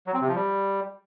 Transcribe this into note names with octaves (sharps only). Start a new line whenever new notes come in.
F#3
C4
C3
F3
G3